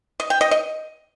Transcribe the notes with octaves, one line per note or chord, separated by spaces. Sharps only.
D#5
G5
D#5
D#5